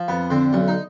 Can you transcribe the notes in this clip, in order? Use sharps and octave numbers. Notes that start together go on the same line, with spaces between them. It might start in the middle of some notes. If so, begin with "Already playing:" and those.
Already playing: F3
F2 B3
D3 C4
B1 C#4
D#4